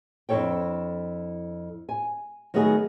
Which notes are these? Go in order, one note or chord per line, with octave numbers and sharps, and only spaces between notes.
F2 D4 E4 A4 C#5 G5
G#5
D#3 F#3 A3 B3 G#4